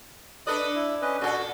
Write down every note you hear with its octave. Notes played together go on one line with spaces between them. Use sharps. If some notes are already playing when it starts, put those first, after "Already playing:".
D4 A4 B4 D5 D#5 D#6
E4
C#4 B4 D#5
A#2 F#4 A4